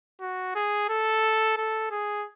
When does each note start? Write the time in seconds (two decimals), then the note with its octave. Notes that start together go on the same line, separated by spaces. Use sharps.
0.21 F#4
0.55 G#4
0.89 A4
1.57 A4
1.91 G#4